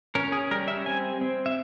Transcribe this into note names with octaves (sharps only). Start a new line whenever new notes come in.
C#4 A#4
G#4
G3 A#4
E5
C4 G#5
C4
E5